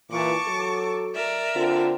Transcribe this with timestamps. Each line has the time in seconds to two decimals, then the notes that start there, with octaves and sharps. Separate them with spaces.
0.11 A#2 E3 A5 C#6 D6
0.46 F#3 A4
1.15 A#4 D5 E5
1.56 D3 C4 F4